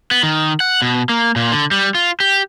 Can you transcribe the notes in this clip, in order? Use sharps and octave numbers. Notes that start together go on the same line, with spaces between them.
B3
D#3
F#5
B2
A#3
A#2
D3
G3
F4
G4